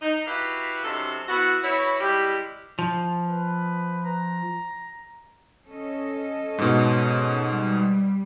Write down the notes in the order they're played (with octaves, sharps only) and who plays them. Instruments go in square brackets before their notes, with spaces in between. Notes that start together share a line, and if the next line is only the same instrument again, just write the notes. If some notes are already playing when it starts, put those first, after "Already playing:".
[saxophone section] D#4
E4 F#4 G4 B4 F5
F#2 C3 D#4 A4
B3 E4 F#4
E4 F#4 B4 C#5
G3 G#3 E4 G4
[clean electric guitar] F3
[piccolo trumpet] B4
A#5
[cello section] C#4 A4 D#5
[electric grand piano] G#2 B2
[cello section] G3